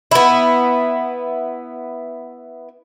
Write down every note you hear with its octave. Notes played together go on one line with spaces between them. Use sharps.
B3 E4